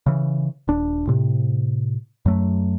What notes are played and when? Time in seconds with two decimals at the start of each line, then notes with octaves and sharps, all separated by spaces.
0.06 C#3 E3
0.68 D#1 D4
1.07 A2 C3
2.26 F#2 F#3 A3